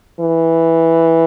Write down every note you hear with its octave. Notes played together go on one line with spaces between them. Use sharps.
E3